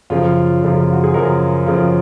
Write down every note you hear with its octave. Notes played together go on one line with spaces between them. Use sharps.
F#2 C#3 F3 F4
F#2 C#3 F3
F4
F#4
G#4
F#2 C#3 F3 A#4
F#2 C#3 F3